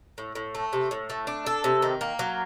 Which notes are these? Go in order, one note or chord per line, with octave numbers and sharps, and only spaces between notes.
A2
A2
A3
C3
A2
A3
D4
A4
C3
D#3
A#3
F#3